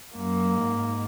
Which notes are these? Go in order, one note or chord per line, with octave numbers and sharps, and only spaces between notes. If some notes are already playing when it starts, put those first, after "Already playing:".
F#2 A#3
G#2